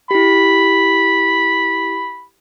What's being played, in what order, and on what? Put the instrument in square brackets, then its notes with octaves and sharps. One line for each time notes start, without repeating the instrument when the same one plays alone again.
[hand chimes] E4 G4 [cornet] B5